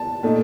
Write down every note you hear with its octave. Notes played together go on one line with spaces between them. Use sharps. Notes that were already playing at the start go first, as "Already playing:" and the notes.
Already playing: A5
A#2 A3 D#4